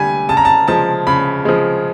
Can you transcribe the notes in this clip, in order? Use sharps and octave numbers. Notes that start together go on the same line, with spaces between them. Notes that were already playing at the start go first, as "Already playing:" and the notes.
Already playing: D3 G3 G#5
C#3 A5
A#5
A5
F3 G#3 A5
C#3 B5
F3 G#3